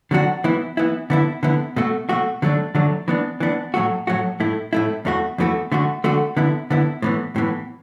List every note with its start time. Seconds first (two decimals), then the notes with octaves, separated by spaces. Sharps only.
0.11 D3 F#3 D4 F#4
0.44 E3 B3 E4
0.77 E3 B3 E4
1.10 D3 B3 E4
1.43 D3 B3 E4
1.77 B2 A3 F#4
2.09 B2 A3 F#4
2.42 D3 F#3 A3 D4
2.75 D3 F#3 A3 D4
3.08 E3 B3 D4
3.40 E3 B3 D4
3.74 A2 F#3 A3 F#4
4.07 A2 F#3 A3 F#4
4.40 A2 A3 E4
4.73 A2 A3 E4
5.05 E2 E3 A3 F#4
5.38 E2 E3 A3 F#4
5.72 D3 A3 F#4
6.04 D3 A3 F#4
6.37 D3 B3 E4
6.71 D3 B3 E4
7.02 A2 E3 B3
7.36 A2 E3 B3